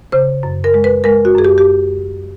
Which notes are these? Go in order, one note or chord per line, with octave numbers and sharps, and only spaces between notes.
C#3 C5
F#2
A#4
G#3
B4
G#3 A#4
F#4
F#2 G#4
G4
G4